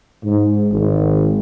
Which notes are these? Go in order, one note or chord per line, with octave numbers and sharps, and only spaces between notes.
G#2
G#1